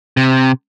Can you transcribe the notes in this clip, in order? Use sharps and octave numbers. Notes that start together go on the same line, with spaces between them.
C3